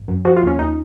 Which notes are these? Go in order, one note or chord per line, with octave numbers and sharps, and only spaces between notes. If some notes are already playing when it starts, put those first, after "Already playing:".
Already playing: G#1
F#2
F3 F#4
F4
D#2 C#4
D#2 D#4